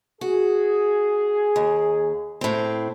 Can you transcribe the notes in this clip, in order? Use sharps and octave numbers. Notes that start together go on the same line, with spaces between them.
F#4 G#4
D#2
A2 C4